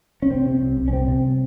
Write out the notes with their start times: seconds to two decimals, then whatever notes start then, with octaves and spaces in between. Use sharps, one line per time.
0.22 C#4
0.30 C3 C4
0.46 C3
0.61 C2
0.77 C2
0.88 C#4
0.93 C3 C4
1.08 C3